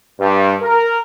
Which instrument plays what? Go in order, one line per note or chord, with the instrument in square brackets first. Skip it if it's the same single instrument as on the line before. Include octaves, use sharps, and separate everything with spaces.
[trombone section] G2
A#4